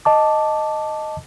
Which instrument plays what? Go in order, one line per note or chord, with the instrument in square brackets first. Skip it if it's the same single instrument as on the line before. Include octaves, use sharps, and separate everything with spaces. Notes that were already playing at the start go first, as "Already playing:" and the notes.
[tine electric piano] D#5 A5 D6